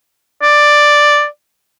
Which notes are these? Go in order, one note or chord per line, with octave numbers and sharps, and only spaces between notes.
D5